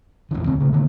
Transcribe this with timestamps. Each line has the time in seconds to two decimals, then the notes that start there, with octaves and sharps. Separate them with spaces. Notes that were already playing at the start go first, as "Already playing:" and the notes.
0.31 F1 C#2 E3
0.46 D2 C4
0.60 C#3 A3
0.73 D3 D#3 A3 B3